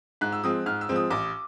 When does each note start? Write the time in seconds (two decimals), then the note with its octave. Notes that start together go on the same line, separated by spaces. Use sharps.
0.21 G#2 F#6
0.32 E6
0.44 F3 G#3 C4 D#6
0.66 G#2 F6
0.81 E6
0.89 F3 G#3 C4
0.96 D#6
1.10 A1 D6